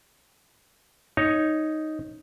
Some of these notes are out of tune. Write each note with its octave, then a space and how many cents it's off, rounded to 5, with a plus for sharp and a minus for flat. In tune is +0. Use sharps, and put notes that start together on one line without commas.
D#4 +0 C#5 +0